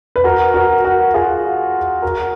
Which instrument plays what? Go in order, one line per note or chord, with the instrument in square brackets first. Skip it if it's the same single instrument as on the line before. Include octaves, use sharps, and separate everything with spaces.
[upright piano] B4
F#4 A#4
F#4 A#4
F#4 A#4
F4 G#4
F#4 A#4